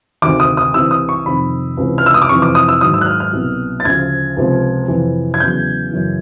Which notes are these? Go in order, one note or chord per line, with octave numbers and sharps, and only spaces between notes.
D2 C3 D#3 D6
D#6
D#6
C2 C3 E3 E6
D#6
C#6
F2 C3 D#3 B5
C#2 C3 E3
F6
E6
D#6
D6
F2 C3 E3 C#6
D6
D#6
E6
G#2 D#3 F#3 D#6
E6
F#6
F6
F6
C2 B2 F#3
A6
D2 C#3 F3 G#6
C#2 C3 F3
F2 C3 E3
G#6
E2 C#3 F#3 G6
F#2 C#3 E3